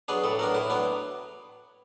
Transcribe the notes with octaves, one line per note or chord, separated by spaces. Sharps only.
F#3 B3 D4 G#4
A2 A4
F#3 B3 D4 A#4
A2 E4
F#3 B3 D4